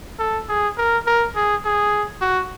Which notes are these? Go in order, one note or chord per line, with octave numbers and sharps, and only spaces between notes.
A4
G#4
A#4
A#4
G#4
G#4
F#4